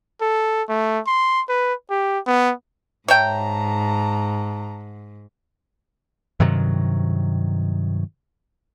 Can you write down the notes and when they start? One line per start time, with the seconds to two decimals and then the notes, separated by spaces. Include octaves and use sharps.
0.21 A4
0.69 A3
1.07 C6
1.49 B4
1.90 G4
2.26 B3
3.08 G#2 C#5 E5 G5 A5 A#5
6.40 G2 C3 D#3 F#3